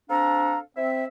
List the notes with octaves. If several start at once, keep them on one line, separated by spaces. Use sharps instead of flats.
C4 D4 A4 F5 A#5
C4 E5